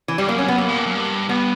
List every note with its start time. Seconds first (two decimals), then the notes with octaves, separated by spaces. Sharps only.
0.08 E3
0.18 G2 G3
0.28 F#2 A#3
0.38 C#4
0.48 B3
0.58 A#3
0.69 A#2
0.78 G2
0.86 F#2
0.95 G2
1.29 G2 B3